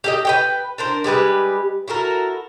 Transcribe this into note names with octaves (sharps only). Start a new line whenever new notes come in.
G4 A4 D#5
B4 C#5 G5
D4 A#4 C5
G3 G#3 G4 B4
E4 F#4 A4 A#4